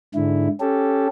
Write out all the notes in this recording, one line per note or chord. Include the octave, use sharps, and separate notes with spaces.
G#2 D3 E4
C#4 G4 A4